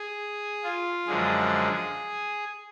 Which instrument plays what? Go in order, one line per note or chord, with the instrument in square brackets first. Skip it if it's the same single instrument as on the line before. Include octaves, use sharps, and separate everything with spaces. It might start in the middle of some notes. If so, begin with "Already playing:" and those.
Already playing: [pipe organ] G#4
F4
F#2 D3 F3 G#3 G#4